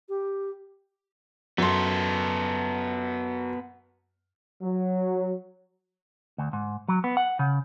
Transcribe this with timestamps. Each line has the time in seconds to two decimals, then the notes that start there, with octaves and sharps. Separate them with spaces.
0.09 G4
1.58 F#2 B3 A4 C6
4.62 F#3
6.38 D2
6.53 G#2
6.88 F#3
7.04 B3
7.17 F#5
7.39 C#3